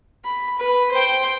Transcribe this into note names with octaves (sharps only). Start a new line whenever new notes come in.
B5
B4
C5 G5